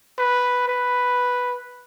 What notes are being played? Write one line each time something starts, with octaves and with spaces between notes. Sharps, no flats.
B4
B4